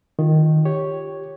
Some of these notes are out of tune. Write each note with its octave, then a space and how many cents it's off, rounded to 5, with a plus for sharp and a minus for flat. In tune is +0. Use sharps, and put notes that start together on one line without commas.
D#3 +0 F4 +0
G4 +0 C#5 +0